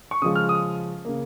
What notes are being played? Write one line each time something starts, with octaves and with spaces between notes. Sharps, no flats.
C#6
C#3 F3 G#3 D#6
F6
D#6
C#3 A#3